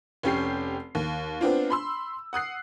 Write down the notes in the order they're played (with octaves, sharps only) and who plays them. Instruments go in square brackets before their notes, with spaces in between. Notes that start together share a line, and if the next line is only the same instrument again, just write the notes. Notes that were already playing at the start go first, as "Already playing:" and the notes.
[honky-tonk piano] F1 C#4 G4 C7
D#2
B3 C4 D4 F4
B5 C6 E6
F#5 D#6 F#6 C7